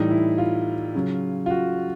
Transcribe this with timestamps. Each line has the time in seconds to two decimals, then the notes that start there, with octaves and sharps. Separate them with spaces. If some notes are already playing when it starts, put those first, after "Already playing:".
Already playing: A2 E3 G3 D#4
0.11 E4
0.38 F4
0.95 C#3 F#3
1.46 F4
1.50 F#4